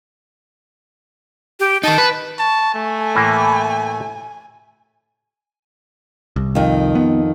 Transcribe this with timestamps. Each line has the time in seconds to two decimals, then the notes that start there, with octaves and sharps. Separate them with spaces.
1.60 G4
1.84 D#3 D#4 A5
1.98 B4
2.39 A5 C#6
2.74 A3 G#5
3.15 A2 E3 A#3
6.36 C2
6.55 F2 D#3
6.95 B3